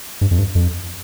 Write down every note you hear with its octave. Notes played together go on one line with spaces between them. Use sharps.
G2
F2
G2
F2